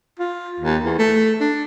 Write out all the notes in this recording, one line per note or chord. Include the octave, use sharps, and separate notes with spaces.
F4
D#2
E2
A3
D4